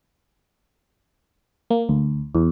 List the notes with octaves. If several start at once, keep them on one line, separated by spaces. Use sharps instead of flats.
A#3
D2
E2